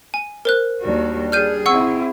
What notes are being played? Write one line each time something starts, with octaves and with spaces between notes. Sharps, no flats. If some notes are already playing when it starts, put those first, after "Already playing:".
G#5
A#4 C5 F#6
D#2 G3 D4 F#4
G#4 F6 G6 D#7
C4 E4 F#5 C#6 E6